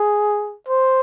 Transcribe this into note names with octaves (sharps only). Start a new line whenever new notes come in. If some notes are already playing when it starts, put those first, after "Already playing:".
Already playing: G#4
C5